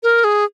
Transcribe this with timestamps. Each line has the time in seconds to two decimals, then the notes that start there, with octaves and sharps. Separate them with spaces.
0.03 A#4
0.24 G#4